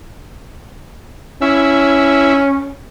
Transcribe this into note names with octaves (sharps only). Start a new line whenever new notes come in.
C#4 E4